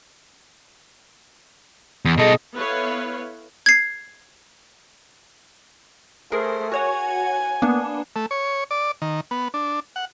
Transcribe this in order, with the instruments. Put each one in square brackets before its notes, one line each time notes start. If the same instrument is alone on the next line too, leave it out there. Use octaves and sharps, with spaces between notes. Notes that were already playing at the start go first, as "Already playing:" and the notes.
[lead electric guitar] E2
[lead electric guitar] B2 A4 [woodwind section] G#4 D#5
[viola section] B3 E4 A4 B4 C#5 F5
[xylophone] G#6 C7
[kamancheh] A3 C5 [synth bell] G#4 A#4
[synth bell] F#4 C#5 F#5 [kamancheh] G#5
[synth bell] A#3 B3 D4
[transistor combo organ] A3
C#5
D5
D#3
B3
D4
F#5